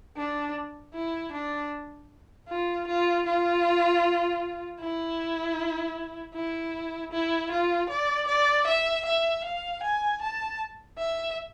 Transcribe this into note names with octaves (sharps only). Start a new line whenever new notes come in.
D4
E4
D4
F4
F4
F4
E4
E4
E4
F4
D5
D5
E5
E5
F5
G#5
A5
E5